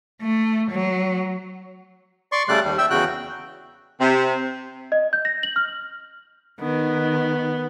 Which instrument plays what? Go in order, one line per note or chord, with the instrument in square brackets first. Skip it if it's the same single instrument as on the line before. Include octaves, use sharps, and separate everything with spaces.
[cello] A3
F#3
[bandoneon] D5 C6 C#6
C#3 G3 A3 D5 F#6
D#2 G3
E5 G5 E6
E2 C#3 F#4 G5 F#6
[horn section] C3
[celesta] D#5
G6
A#6
F#7
F6
[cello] D#3 [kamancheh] B3